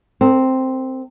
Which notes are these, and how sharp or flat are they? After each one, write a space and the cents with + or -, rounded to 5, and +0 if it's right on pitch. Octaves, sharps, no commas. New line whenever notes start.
C4 +0 A#4 -45